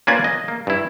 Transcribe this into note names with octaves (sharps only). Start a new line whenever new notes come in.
A#3 C#4 F4 B4 D5 G#5
D#5
A#3
G2 E4